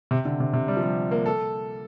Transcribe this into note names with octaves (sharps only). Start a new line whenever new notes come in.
C3
D3
C3
C3
G3
F3
G3
A#3
A4